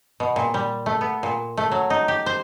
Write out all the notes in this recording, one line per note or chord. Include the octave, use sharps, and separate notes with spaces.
B2
A#2
G3
A3
B3
A#2
A3
F#3
D#4
G4
C5